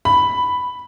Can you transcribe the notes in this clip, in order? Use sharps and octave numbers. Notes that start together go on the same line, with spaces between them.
B5